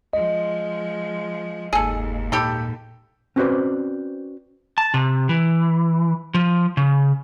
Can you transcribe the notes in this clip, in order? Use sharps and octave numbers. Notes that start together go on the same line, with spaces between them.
F3 G#3 D#5
F#1 D#2 G#2 G#4 A4
A#2 G4 A4 B5
C4 C#4 F#4 B4 C5 D5
A5
C3
E3
F3
C#3